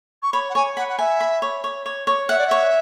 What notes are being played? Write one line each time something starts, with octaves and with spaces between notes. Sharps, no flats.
C#6
C#5 B5
F#5
C#5 G#5
F#5 B5
F#5
E5 G#5
B5
C#5
C#5
C#5
C#5
E5 F#5
D5
C#5 E5